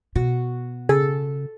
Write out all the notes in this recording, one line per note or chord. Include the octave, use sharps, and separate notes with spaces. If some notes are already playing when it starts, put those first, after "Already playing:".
B2 F#4
C#3 G#4 A4